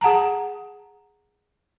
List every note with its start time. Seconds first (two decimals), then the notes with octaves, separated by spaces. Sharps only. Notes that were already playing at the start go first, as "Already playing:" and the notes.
0.01 G#4 F#5 A5 A#5